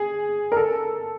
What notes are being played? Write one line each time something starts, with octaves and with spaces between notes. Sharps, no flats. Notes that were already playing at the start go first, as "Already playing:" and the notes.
Already playing: G#4
A#4
A4